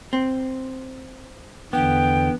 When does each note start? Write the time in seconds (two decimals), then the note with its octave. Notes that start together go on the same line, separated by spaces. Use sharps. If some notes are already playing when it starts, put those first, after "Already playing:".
0.13 C4
1.73 E2 D3 B3 G5